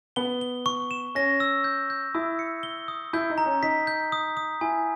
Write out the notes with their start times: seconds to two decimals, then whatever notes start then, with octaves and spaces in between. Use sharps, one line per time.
0.16 B3 G7
0.41 G7
0.66 C#6
0.91 E7
1.15 C#4 A#6
1.40 E6
1.64 G6
1.90 G6
2.15 E4 D#6
2.39 C#7
2.63 G7
2.88 D#6
3.13 E4 G6
3.30 D#4
3.38 A#5
3.46 C#4
3.62 D#4 B6
3.87 G6
4.12 D#6
4.37 D#6
4.61 E4 G#5